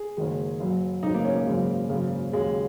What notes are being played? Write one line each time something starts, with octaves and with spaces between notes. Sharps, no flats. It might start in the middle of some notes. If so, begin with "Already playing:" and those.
Already playing: G#4
F#1 F#2 D#3 G#3
F#1 F#2 F#3
G#1 F#2 C#3 D#4
A#3
C#4
A#3
G#1 F#2 C#3 G#3
G#1 F#2 C#3 G#3
D#2 C#3 F#3 G#3